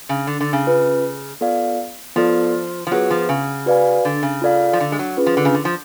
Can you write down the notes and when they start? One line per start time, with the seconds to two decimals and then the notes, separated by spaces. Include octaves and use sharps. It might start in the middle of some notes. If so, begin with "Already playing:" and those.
0.09 C#3
0.27 D3
0.41 D3
0.53 C#3
0.65 C#4 F4 B4
1.41 B3 F4 A4 D5 F5
2.16 F3 B3 F4 A4 D5
2.87 F3
2.91 F#3 B3 F4 G#4 B4
3.10 F3
3.29 C#3
3.66 F#4 B4 D5 F5 G#5
4.05 D3
4.23 C#3
4.42 F4 A4 D5 F5
4.73 F3
4.80 D3
4.92 G#3
4.99 F#3
5.17 C#4 F4 G#4 B4
5.26 F3
5.37 D3
5.45 C#3
5.55 D3
5.65 F3